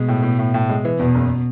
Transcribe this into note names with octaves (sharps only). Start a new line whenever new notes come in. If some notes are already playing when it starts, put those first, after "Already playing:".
Already playing: B2 G#3
A2
A2
A2
A2
G#3
E3
E2 B2
F#1